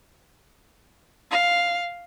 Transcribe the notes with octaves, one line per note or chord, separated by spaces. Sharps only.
F5